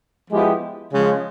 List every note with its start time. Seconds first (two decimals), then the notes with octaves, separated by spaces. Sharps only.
0.31 F3 G#3 B3 E4 G4
0.92 C#3 F3 G#3